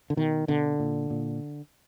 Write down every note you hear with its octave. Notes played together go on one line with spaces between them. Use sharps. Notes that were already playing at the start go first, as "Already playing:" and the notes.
D3
B2 D#3
B2 D3
A#2
A#2